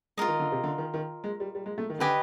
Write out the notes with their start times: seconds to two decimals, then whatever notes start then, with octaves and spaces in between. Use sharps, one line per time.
0.17 G#3 F4 A#4 D#5
0.28 D#3
0.40 D3
0.52 C3
0.64 D3
0.78 D#3
0.94 D#3
1.24 G#3
1.40 G3
1.55 G3
1.66 G#3
1.78 A3
1.90 D#3
1.99 D3 G4 B4 D#5 G#5